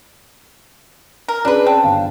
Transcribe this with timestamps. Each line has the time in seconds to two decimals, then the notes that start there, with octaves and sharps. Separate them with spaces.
1.28 A#4
1.45 C#4 D4 G#4 B4 D5
1.66 C4 A5
1.84 G1 F5